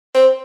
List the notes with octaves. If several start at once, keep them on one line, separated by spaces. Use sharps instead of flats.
C4